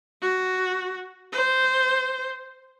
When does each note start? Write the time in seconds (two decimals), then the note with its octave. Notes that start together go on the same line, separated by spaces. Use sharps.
0.22 F#4
1.32 C5